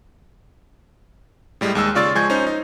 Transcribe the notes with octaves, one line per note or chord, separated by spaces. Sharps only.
A2 G3 G#3
D#2 G#3 E6
C#3 F4 D5 C#6 E6 A6
F3 G#3 G#5 C#6 G6 G#6
C#4 D#4 C5
D#4